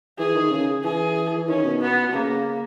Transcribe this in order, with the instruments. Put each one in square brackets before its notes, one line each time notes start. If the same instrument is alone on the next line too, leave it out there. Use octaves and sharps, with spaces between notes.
[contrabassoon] E3 [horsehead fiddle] G#4
[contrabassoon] D#3
C#3
[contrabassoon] E3 [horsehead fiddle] G#4
[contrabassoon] E3
[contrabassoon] D#3 [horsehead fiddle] C#4
[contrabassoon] B2
[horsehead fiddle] B3
[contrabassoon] B2
[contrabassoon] C#3 [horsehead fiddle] A#3